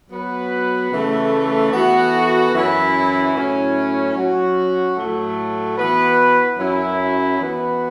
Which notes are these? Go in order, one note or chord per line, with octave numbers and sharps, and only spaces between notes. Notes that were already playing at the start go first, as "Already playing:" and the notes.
F#3 B3 F#4 B4
C#3 E3 A3
E3 B3 F#4 A4
F#2 E3 C#4 E4 B4
A2 F#3 C#4 E4
F#3 C#4 F#4
A2 F#3 A3
E3 B3 F#4 B4
F#2 F#3 C#4 E4
E3 B3 F#4 B4